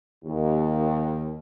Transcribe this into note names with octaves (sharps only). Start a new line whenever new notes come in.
D#2